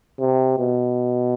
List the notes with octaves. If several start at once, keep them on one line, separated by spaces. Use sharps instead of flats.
C3
B2